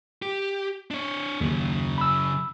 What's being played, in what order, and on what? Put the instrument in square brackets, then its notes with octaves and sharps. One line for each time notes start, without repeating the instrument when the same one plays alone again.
[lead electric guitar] G4
D4 C#5
[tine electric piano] D#2 [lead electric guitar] C#3 F#3
[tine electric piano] B5 E6